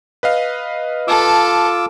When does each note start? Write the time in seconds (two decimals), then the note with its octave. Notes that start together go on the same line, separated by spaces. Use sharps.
0.23 B4 D#5 F5
1.08 F4 A4 A5 D6 E6